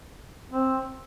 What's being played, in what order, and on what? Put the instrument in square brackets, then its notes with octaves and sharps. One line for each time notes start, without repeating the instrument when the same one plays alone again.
[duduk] C4